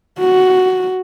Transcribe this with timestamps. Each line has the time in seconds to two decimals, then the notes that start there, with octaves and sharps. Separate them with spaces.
0.19 F#4